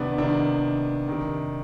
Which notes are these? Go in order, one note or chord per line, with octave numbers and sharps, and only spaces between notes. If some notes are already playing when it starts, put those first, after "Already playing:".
Already playing: C3 D#3 B3 D4 B4
C3 D#3 D4
C3 D#3